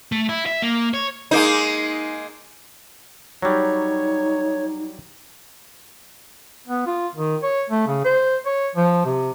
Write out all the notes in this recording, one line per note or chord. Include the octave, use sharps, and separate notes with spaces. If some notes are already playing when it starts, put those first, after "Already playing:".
A3
E4
E5
A#3
C#5
G#3 A#3 D#4
F#3 G3 D#4 C#5
B3
F4
D#3
C#5
A3
C#3
C5
C#5
F3
C3